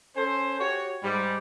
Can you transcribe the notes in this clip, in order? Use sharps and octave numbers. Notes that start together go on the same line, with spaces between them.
C#4 A4 C5
F#4 G4 C#5
G#2 G3